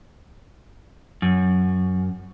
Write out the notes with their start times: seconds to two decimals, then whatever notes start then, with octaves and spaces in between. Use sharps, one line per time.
1.22 F#2